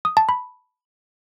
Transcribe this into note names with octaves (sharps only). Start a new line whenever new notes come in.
D#6
A5
B5